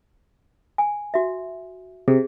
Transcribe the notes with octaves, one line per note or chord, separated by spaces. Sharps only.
G#5
F#4 E5
C3 G#4